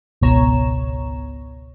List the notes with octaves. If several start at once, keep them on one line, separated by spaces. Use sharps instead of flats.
G#1 C#2 B2 C#5 A#5 E7